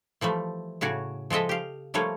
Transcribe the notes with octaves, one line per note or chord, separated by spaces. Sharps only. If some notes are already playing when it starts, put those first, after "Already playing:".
E3 F3 G3 A3
A2 C#3 F#4 C#5 D5
F3 G#3 A4 D#5 E5
G4 F5
F3 G3 A3 A#3 C#5